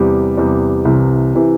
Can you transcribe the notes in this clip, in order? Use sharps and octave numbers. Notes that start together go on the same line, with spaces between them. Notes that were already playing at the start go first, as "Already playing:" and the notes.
Already playing: E2 C3 G3
E2 C3 G3
C2 C3 E3
C3 E3